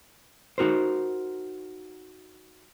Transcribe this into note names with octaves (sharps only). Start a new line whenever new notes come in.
D#4 F#4 A#4 C5